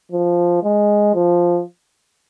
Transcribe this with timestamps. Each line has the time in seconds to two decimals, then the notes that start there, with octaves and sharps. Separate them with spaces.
0.12 F3
0.63 G#3
1.15 F3